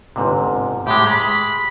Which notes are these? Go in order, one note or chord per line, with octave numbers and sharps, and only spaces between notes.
G1 G#2 C3
A2 G#3 G4
G#3 B5